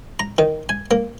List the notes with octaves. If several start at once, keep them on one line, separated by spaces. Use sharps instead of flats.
A#5
D#3
G#5
A#3